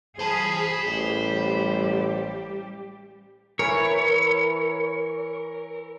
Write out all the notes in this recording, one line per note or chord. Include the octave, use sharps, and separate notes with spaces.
G#4 C5 A5 B5
A1 G3 G4
E3 E4 A#4 C#5